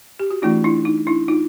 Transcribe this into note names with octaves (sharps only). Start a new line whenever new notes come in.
G4
F#4
E3 A3 C#4 D#4 F4
D4 E4
D#4
D4 E4
D#4 F4